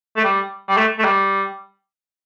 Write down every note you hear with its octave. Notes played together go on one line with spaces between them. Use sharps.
A3
G3
G3
A3
A3
G3